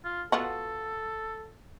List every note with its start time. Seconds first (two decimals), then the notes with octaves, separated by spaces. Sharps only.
0.05 F4
0.32 B3 F4 F#4 A4